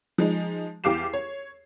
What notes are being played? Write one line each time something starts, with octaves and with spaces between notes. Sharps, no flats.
F3 G#3 D#4
E2 G4 F5 D6 C7 E7
C#5